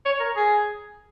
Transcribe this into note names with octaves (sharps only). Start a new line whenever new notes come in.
C#5
A#4
G#4